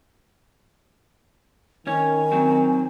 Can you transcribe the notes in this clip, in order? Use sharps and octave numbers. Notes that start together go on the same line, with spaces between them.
D#3 C#4 C#5 G#5
F#3 C4